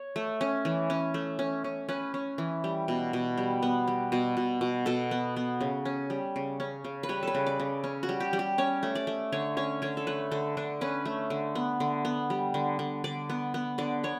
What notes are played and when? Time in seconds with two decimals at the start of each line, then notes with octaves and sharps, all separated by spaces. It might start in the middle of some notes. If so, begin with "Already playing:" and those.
Already playing: C#5
0.16 A3
0.41 C#4
0.65 E3
0.90 C#4
1.14 A3
1.39 C#4
1.64 C#4
1.89 C#4 B4
2.14 C#4
2.38 E3
2.64 G3
2.88 B2
3.13 B2
3.38 G3
3.62 B3
3.87 G3
4.12 B2
4.37 B2
4.61 B2
4.86 B2 A4
5.11 B3
5.37 B3
5.61 C#3
5.85 C#4
6.10 G3
6.36 C#3
6.60 C#4
6.84 C#3
7.03 B4
7.09 G3 C#5
7.23 A4 B4
7.35 C#3
7.46 D5
7.60 C#3
7.84 C#4
8.03 F#4
8.09 G3
8.20 G4
8.33 G3
8.39 G4
8.58 C#4 C#5
8.83 A3
8.95 D5
9.07 A3
9.32 D3 C#5
9.57 C#4 C#5
9.82 D3 C#5
9.97 A4
10.07 A3 B4
10.31 D3 A4
10.57 D3 D4
10.81 C#4 B4
11.05 A3
11.30 D3
11.55 B3
11.80 D3
12.05 B3
12.30 G3
12.54 D3
12.79 D3
13.04 D3 D5
13.30 B3
13.54 B3
13.78 D3 D5
14.04 B3 C#5